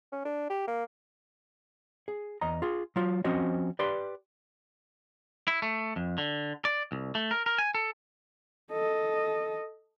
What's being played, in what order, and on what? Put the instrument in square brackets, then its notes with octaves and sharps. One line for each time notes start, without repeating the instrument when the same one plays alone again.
[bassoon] C#4
D4
G4
A#3
[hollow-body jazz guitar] G#4
E2 D#5 A#5
F4 G#4
F#3 F4
F3 C4 C#4 F#4 C5 D#5
G4 B4 D5 C6
[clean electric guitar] E4
A3
F2
D3
D5
C2
A3
A#4
A#4
G#5
A4
[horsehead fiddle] A4 D#5